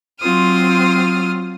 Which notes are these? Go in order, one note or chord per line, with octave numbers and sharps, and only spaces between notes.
F#3 C4 F4 D#6 F6